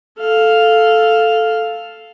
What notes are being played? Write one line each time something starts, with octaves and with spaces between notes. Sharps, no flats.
A4 F5